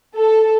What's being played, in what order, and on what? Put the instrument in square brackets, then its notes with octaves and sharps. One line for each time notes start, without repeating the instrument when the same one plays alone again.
[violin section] A4